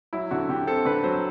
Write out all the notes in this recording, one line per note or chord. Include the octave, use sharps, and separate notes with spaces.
F#3 E4
D3 F#4
D3 G4
C4 A4
D3 B4
F#3 C5